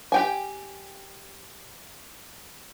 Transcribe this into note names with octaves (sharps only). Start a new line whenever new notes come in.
G4 G5 G#5